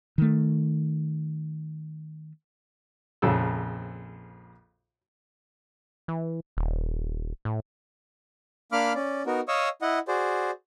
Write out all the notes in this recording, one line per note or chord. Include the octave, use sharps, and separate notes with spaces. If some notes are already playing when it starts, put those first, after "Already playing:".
D#3 A3
A#1 F2 C#3 A4 E6
E3
D#1
A2
A#3 D4 F5 B5 D6 F6
C#4 D5
B3 D#4 F#4 A#4
C#5 D#5 F5 C#6 D#6 E6
E4 D#5 F#5
F#4 G#4 C5 D5